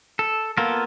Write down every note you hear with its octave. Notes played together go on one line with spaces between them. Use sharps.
A4
A#3 B3 F4 A4 A#4